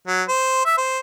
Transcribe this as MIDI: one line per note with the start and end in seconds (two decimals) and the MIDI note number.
0.07 0.22 54
0.28 0.62 72
0.65 0.76 76
0.78 0.99 72